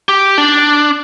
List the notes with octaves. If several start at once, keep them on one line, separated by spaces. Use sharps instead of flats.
G4
D4